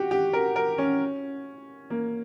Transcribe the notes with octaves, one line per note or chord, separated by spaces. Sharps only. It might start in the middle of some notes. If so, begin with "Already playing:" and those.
Already playing: F#4 G4
G4
A#4
A#4
C#4
A#3